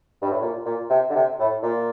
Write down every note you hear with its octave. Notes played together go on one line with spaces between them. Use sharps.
G2
A2
A#2
A#2
C3
D3
C3
A2
A#2